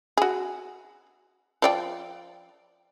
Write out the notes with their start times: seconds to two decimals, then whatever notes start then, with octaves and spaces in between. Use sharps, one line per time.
0.17 F#4 G#4
1.62 F3 D5 G5